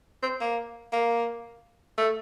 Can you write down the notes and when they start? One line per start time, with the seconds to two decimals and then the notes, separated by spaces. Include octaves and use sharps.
0.23 C4
0.40 A#3
0.92 A#3
1.98 A3